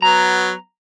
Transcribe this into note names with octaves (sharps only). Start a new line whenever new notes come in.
F#3 B3 A#5